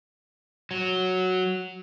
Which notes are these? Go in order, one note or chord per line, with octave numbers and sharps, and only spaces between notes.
F#3